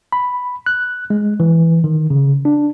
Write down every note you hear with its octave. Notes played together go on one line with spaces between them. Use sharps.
B5
F#6
G#3
E3
D#3
C#3
D4